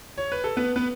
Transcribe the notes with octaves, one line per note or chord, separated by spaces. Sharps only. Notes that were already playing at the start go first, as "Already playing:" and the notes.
C#5
B4
A4
B3 B4
B3 B4